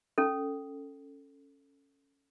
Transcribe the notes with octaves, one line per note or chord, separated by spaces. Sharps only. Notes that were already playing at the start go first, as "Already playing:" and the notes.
C#4 A4